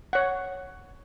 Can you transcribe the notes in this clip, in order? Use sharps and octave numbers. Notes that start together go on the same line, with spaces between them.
C#5 F#5